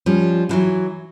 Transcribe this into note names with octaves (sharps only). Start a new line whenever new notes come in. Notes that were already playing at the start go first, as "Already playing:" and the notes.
F3 G3 C#4
D3 E3 F#3